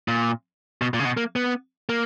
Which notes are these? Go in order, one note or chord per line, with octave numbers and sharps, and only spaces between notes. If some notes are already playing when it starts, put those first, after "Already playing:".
A#2
B2
A#2
C#3
B2
A#3
B3
A#3